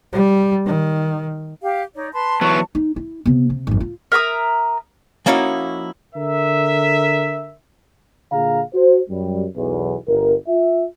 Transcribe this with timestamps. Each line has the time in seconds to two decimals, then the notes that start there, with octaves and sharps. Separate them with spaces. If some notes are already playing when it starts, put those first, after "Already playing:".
0.13 G3
0.66 D#3
1.61 G4 F5
1.95 D#4 C#5 D5
2.13 B4 A5 C6
2.41 E3 F#3 B3 C#6
2.75 D#4
2.96 E4
3.26 C3 B3
3.50 C3
3.67 G#1 F#2
3.80 F4
4.12 A#4 E5 A#5 D#6
5.26 F3 A#3 C#4 D#4 E4 F#4
6.15 D3 A#4 E5
8.31 A#2 D3 G#4 F5 A#5
8.74 F#4 C5
9.09 F#2 G3
9.56 B1 E2
10.07 G1 A#4
10.48 F4 E5